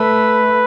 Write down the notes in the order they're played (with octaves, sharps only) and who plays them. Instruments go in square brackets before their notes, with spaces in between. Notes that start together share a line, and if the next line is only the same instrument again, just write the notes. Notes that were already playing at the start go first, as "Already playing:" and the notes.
Already playing: [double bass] A3 [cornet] B4